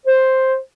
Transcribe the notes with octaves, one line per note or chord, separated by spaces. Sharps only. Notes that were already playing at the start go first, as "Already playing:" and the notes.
C5